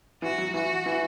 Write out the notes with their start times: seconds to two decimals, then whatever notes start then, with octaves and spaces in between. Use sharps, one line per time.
0.22 E3 F#4
0.38 F#3
0.54 E3 F#4
0.86 E3